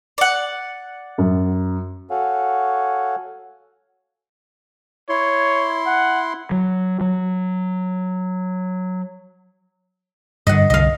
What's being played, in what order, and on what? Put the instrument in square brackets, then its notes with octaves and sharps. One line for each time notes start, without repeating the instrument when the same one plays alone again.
[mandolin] D5 F#5
[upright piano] F#2
[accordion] F#4 A4 C#5 F5 F#5 G#5
[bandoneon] E4 C6 [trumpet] C#5
[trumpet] F#5
[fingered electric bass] F#3
F#3
[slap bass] G2 D3 [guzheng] D#5 F#5
[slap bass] C2 D3 [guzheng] D#5 F5